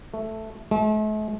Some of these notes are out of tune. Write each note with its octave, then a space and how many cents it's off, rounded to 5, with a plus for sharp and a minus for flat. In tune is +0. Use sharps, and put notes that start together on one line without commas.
A3 +0
A3 -45